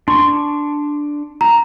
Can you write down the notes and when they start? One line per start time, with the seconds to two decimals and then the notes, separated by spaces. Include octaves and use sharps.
0.08 D4 C6 C#6
1.41 A#5